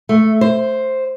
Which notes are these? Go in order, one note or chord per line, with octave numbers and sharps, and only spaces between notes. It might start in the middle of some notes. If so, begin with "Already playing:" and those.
A3
C5